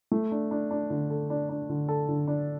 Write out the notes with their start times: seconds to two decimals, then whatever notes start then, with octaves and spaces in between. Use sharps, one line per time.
0.12 A3
0.32 D4
0.51 D4
0.71 D4
0.90 D3
1.10 A4
1.30 D4
1.49 D4
1.69 D3
1.89 A4
2.09 D3
2.28 D4